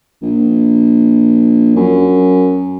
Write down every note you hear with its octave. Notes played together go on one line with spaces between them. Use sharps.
A#1
F#2